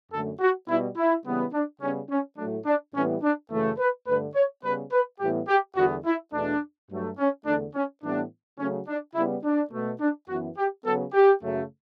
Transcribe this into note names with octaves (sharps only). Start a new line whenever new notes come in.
F#2 D3 A3 A4
F#4
B2 G3 B3 E4
E4
C#3 E3 G3 B3
D4
C#3 G3 B3 C#4
C#4
A2 F#3 A3 D4
D4
A2 E3 G3 B3 C#4
D4
F#2 C#3 E3 A3
B4
G2 D3 A3 B4
C#5
C#3 G3 B3 B4
B4
A2 E3 G3 B3 G4
G4
E2 D3 G3 B3 F#4
E4
E2 B2 A3 D4
G2 F#3 A3
C#4
E2 D3 A3 D4
C#4
A2 E3 G3 B3 D4
C#3 F#3 A3 C#4
D4
C#3 G3 B3 E4
D4
B2 A3
D4
F#2 E3 B3 F#4
G4
C#3 F#3 B3 A4
G4
F#2 C#3 F#3 A3